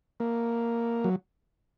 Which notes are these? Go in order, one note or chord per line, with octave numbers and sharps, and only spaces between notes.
A#3
F#3